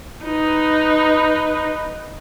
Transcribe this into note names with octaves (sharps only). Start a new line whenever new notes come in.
D#4 B4